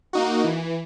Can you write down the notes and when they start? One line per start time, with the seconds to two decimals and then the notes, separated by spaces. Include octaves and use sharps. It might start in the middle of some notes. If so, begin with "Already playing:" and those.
0.13 A#3 D#4 F#4
0.44 E3